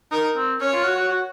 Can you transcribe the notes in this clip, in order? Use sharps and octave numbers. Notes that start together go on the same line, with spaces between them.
D#4 A#4
C4
C#4 C#5
F4
F#4
F#4
F#4